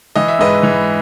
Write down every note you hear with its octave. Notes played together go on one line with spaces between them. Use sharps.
E3 D#5
E5
G#2 B4 D#5
E3